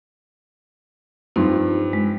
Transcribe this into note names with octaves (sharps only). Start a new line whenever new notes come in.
G2 F3 C4 D#4
G#3